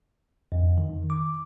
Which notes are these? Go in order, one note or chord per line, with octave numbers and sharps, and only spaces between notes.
F2
D#3
D6